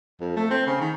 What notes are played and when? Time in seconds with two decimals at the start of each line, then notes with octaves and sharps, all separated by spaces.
0.21 F2
0.36 A3
0.51 C4
0.66 C#3
0.81 D#3